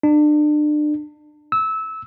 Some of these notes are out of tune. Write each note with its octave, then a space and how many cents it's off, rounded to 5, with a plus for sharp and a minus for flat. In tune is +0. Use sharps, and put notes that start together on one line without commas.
D4 +35
E6 -20